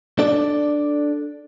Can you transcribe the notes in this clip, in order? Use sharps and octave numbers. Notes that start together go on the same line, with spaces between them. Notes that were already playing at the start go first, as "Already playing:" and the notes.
D4 A4 D5